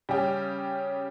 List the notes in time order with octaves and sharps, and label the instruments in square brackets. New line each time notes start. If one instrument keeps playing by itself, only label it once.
[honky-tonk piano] C#3 G3 C#4 G4